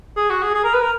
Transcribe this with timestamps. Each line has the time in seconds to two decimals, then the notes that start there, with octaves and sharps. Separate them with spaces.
0.17 G#4
0.30 F#4
0.42 G#4
0.55 G#4
0.64 A#4
0.74 B4
0.83 A#4